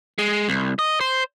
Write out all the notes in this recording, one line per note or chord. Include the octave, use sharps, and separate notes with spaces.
G#3
C2
D#5
C5